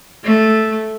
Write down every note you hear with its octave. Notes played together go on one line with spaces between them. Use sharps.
A3